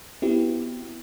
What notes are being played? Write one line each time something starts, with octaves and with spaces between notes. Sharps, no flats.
B3 C4 E4 F#4 G4